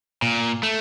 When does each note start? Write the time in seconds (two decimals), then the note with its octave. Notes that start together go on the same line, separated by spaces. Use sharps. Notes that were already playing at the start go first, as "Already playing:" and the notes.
0.22 A#2
0.63 A3